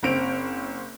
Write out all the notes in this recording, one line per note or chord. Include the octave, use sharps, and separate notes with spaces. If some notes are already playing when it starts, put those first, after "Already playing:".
F#1 C4 D7 F7